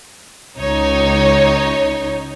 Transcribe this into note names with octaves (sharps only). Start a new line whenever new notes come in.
C#2 D#4 C#5